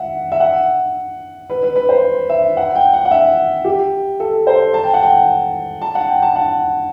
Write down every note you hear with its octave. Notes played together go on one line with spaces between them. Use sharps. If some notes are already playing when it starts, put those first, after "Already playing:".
Already playing: E5 F#5
E5
F#5
B4
B4
B4
C5
E5
F#5
G5
F#5
F#5
E5
G4
A4
C5
A5
G5
F#5
G5
A5
F#5
G5
A5
F#5